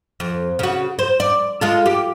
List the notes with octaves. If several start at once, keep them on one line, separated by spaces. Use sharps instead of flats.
F2
C#3 F#4
C5
D5
G#3 F4 A4
G4